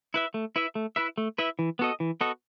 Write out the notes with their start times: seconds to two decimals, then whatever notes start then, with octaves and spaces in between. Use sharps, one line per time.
0.14 E4 B4 E5
0.34 A3
0.56 E4 B4 E5
0.75 A3
0.96 E4 B4 E5
1.18 A3
1.38 E4 B4 E5
1.59 E3
1.79 B3 F#4 A4 D#5
2.00 E3
2.21 B3 F#4 A4 D#5